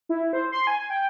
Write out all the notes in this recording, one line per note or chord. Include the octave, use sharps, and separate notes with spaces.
E4
C5
C6
G#5
G5